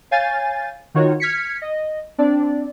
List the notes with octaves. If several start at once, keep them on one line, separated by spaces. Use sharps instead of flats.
C#5 F5 G#5 G6 A6
D#3 D#4 F4 F#4 A#4 C#5
F6 G#6 B6 C#7
D#5
C4 D4 D5